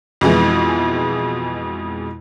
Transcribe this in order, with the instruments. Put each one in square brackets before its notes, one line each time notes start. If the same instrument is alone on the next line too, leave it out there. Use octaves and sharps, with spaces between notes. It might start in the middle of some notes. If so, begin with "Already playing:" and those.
[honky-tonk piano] F2 B2 E3 G#3